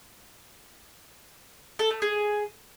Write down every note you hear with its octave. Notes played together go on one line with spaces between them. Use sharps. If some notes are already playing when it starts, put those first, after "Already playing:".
A4
A3
G#4